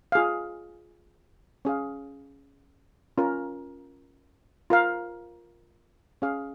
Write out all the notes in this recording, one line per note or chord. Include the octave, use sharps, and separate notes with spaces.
F4 G#4 F5
C#4 G#4 F5
C#4 F4 A#4
F4 A#4 F5
C#4 G#4 F5